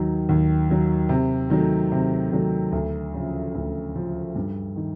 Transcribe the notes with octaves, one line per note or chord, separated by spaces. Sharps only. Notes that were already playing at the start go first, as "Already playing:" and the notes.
Already playing: D#2 D#3 F#3
D#2
D#3 F#3
C3
D#3 F#3 A3
C3
D#3 F#3 A3
D2
C#3 F3
D2
C#3 F3
G2
D#3